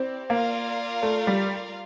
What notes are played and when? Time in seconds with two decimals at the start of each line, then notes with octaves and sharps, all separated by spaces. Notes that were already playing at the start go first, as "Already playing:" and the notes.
Already playing: C4 E4 G4 D5
0.30 A#3 F4 A#4 D5 F5
1.03 A3
1.27 G3